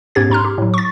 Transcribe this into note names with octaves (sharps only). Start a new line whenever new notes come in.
G#2 B3 C#4 G4 G#6 A6
G#2 A#5 C6 F6
G4
A2 F#3
C#6 A6